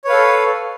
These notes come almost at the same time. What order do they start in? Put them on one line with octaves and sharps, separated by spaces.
C#5 B4 F5 A4